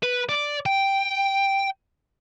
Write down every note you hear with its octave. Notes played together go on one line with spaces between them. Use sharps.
B4
D5
G5